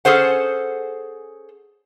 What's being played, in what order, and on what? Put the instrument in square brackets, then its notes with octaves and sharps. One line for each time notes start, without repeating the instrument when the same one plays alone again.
[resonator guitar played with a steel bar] C#4 G#4 A4 C5 F#5